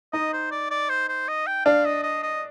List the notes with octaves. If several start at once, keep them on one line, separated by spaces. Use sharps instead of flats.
D#4 D#5
C5
D5
D5
C5
C5
D#5
G5
D4 F5
D#5
D#5
D#5